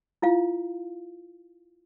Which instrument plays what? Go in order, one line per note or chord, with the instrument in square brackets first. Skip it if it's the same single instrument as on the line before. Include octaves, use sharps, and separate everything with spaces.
[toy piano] E4 F4 F5